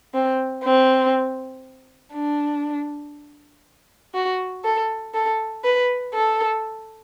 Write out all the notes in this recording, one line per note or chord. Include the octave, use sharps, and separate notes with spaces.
C4
C4
D4
F#4
A4
A4
B4
A4